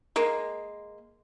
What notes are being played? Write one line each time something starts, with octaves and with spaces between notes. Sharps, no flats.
G#3 A#3